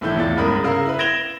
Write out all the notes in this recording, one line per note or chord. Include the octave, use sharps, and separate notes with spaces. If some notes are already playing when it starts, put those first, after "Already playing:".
B1 A2 E3 E4 G6
E2 E3 F4 A6
G1 C#2 A#4 B5 D#6
C#3 A#4 F5 E6
E4 B4
G#6 A#6 D7 E7 F7 G7